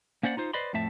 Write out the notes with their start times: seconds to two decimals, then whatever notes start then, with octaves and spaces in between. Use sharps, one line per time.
0.23 A#3 C#4 C5 D5 F#5
0.37 D#4 F4 C5
0.53 B4 C5 D5 D#5 B5 C6
0.73 F2 A2 A3 E5 A5